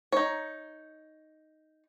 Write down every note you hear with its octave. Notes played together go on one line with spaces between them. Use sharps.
D#4 C#5